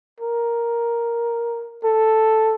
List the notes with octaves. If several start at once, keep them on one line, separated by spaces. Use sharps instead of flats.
A#4
A4